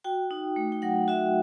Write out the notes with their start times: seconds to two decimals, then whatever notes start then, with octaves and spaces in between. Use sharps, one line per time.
0.04 F#4 G5
0.31 D#4
0.56 A3
0.72 G5
0.82 F#3 F#5
1.08 F#4 E5